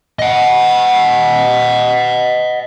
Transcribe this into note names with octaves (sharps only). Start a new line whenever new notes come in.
D#5 F#5